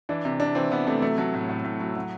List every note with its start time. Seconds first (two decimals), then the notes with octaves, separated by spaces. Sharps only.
0.09 E3 D4
0.25 C3
0.40 C3 D4
0.55 E3 C4
0.71 E3 B3
0.87 C3 A3
1.02 F#3 A3
1.18 F#3 A3
1.34 A2
1.49 A2
1.64 A2
1.80 F#3
1.95 F#3